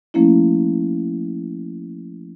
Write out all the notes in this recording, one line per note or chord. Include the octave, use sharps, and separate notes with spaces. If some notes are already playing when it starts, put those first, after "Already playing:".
F3 A3 A#3 C#4 E4